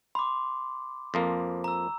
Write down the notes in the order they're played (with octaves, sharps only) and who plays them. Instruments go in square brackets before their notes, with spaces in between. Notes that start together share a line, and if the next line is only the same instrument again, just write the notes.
[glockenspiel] B5 D6 [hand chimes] C6
[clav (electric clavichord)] F2 F3 A#3
[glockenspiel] A#5 E6